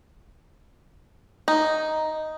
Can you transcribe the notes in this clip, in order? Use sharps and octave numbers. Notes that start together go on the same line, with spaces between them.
D#4